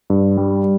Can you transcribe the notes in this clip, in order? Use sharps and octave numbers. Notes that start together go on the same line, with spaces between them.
G2
G3